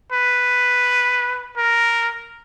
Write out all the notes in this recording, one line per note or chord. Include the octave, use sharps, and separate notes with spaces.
B4
A#4